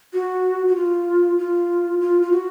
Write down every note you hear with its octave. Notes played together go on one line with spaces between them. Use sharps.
F#4
F#4
F4
F4
F4
F4
F#4